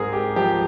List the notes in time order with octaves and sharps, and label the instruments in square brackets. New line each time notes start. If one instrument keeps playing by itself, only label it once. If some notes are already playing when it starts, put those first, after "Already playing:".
Already playing: [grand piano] G#2 G#3 C4 G#4 A#4
G4
F3 G4